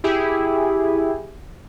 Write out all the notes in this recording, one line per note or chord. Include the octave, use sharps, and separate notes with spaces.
E4 G4 G#4